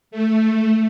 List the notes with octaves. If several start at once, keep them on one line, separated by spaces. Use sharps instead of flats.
A3